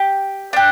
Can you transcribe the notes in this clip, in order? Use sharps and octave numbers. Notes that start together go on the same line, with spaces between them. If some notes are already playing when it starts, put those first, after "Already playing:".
Already playing: G4
D4 G4